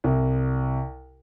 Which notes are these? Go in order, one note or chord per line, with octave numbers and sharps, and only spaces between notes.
C2